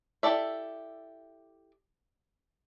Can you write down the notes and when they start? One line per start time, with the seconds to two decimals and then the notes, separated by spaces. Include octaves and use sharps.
0.23 E4 G4 A4 D5 E5